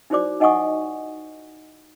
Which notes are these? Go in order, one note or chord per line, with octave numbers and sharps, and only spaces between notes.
D#4 E4 F#4 C5 D5 D6
D#4 D#5 F#5 G#5 C#6 D#6